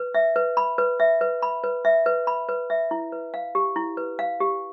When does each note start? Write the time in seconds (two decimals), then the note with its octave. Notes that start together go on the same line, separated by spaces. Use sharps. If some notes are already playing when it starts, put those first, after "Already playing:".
Already playing: B4
0.15 E5
0.36 B4
0.57 B5
0.78 B4
1.00 E5
1.21 B4
1.42 B5
1.64 B4
1.85 E5
2.06 B4
2.27 B5
2.49 B4
2.70 E5
2.91 E4
3.12 B4
3.34 F5
3.55 G4
3.76 E4
3.97 B4
4.19 F5
4.40 G4